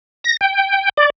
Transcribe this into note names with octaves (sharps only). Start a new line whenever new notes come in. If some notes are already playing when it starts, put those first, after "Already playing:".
A#6
G5
D5